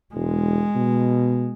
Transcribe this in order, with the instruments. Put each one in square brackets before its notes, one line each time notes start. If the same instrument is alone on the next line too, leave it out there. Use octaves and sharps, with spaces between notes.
[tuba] E1 [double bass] G#3
[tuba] B2